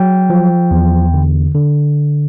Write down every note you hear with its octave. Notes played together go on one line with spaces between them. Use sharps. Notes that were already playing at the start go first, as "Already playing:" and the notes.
Already playing: F#3 G5
F3
E2
D3
D3